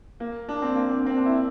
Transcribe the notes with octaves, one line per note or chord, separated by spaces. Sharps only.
A#3
D4
C4
A#3
C4
C4
D4
E4